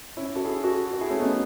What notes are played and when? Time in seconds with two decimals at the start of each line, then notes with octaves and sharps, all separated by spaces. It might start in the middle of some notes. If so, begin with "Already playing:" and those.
0.17 C#4 E4
0.36 F#4 A4
0.44 E4 G#4
0.63 F#4 A4
0.93 F#4
1.01 E4 G#4
1.10 A3 C#4
1.20 B3 D#4